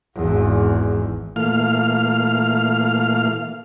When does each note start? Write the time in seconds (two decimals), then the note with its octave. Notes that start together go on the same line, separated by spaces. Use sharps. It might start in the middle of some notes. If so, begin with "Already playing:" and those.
0.15 G#1 E2
1.36 A#2 E3 A3 F5 F6